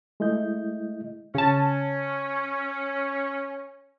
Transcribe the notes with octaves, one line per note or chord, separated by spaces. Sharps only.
G#3 A3 E4 D#5 G6
C#3 C#4 A5